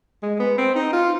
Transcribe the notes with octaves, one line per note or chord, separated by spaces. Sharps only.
G#3
B3
C4
D#4
F4